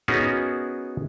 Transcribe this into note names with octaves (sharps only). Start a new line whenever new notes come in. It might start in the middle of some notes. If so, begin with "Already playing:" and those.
B3 C#4 D#4 F#4 G#4 A#4